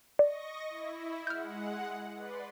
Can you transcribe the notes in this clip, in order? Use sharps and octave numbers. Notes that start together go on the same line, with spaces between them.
D5 D#5 C#6 A#6
E4
G#3 F#5 F6 G6
B4 D5 C6